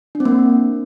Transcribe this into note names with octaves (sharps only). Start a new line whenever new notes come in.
D4
C4
A#3